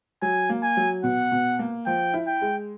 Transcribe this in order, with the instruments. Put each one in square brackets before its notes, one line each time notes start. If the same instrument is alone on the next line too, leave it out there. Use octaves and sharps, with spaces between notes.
[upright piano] F#3 [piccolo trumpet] G#5
[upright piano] A#3
[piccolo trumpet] G#5
[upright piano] F#3
[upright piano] B2 [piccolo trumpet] F#5
[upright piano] B2
A#3
[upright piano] F3 [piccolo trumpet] G5
[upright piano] E4
[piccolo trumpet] G5
[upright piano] G#3